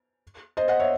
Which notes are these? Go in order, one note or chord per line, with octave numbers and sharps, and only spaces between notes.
C5 D#5
D#5 F#5
C#5 E5